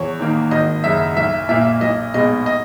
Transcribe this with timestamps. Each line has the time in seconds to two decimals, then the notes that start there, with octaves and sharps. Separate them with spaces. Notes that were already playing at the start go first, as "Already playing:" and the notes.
Already playing: E2 C#5
0.19 D#3 A#3
0.51 G#1 D#5
0.84 F#2 C#3 E5
1.16 B1 E5
1.49 A#2 A#3 E5
1.81 B1 D#5
2.14 B2 G#3 D#5
2.46 D#5